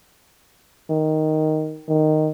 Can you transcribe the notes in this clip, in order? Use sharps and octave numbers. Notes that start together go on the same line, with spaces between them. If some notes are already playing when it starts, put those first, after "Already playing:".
D#3
D#3